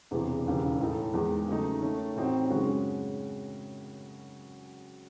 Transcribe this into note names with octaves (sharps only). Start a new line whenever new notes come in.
E1 E2 C3 E3
E1 D#2 C#3 E3
A2 E3 A3 D#4 A4
E2 D#3 G#3
C#3 F#3 A3 D#4
D#3 A3 C#4
A2 E3 C4 D#4 F#4
F#2 C#3 G#3 C#4 F#4